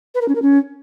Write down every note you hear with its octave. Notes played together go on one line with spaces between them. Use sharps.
B4
A#4
C#4
A#4
C#4